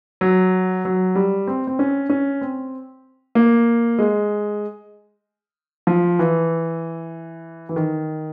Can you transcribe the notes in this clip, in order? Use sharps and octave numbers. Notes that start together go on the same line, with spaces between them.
F#3
F#3
G3
C4
C4
C#4
C#4
C4
A#3
G#3
F3
E3
E3
D#3